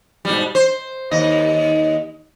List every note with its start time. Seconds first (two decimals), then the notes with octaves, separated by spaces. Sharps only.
0.25 G#2 B2 G3
0.55 C5
1.11 D#2 D#5